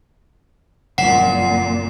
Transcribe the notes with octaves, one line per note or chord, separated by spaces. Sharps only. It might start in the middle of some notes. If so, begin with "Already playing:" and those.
F#1 F2 A#2 F#5 C7 E7